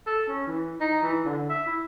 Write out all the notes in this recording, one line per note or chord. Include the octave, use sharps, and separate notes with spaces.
A4
C#4
E3
D#4
E3
D3
E5
E4